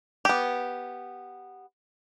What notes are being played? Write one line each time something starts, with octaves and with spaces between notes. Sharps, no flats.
B3 G4